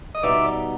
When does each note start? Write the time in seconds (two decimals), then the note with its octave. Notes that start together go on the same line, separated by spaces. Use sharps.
0.15 D#5
0.23 B2 G3 B3 D#4 D5 E5